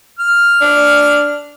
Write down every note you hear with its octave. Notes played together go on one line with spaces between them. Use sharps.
F6
D4